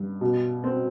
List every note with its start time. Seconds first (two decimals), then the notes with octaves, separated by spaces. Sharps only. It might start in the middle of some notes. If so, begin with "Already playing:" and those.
Already playing: G2
0.21 B2
0.64 C4